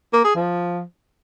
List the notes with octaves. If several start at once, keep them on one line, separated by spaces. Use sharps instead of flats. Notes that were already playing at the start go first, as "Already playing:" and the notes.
A#3
G#4
F3